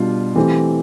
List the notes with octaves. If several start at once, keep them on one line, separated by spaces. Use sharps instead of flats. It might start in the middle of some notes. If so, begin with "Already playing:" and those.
Already playing: B2 G3 D4 F4
E3 A3 C4 G4